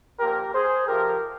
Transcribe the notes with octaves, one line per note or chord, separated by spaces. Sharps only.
A#2 F3 A#3 G4 A#4
G#4 C5
F2 C3 F3 G4 A#4